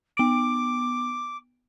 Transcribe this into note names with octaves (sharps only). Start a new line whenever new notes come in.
B3 D6 D7